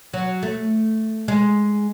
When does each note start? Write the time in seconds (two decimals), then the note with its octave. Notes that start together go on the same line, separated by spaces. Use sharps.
0.14 F#3
0.43 A3
1.28 G#3